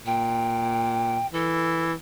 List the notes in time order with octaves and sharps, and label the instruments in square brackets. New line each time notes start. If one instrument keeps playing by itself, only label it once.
[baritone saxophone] A#2 [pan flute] G5
[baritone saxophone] E3 [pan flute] A4